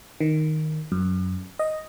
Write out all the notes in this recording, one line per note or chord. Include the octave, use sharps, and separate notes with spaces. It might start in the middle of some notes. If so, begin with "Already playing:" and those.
D#3
F#2
D#5